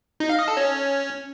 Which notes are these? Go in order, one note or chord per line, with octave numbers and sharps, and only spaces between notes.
D#4
F5
D#5
A4
C#4